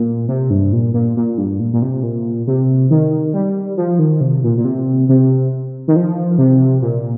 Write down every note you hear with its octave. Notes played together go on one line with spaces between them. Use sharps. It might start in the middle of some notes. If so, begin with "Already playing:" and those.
Already playing: A#2
C3
G2
A#2
A#2
A#2
G2
A#2
A#2
C3
A#2
C3
D#3
G3
F3
D#3
C3
A#2
A#2
C3
C3
D#3
F3
C3
A#2